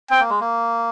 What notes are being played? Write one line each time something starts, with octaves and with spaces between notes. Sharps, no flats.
C4 G5
A#3
G#3
A#3